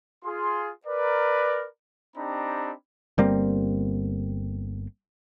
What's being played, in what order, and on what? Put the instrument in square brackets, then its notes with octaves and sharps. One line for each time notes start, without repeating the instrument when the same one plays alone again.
[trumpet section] F4 G#4 C6
A#4 B4 D5
C4 D4 D#4 G4 A#5 B5
[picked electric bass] G1 G3 A#3 C4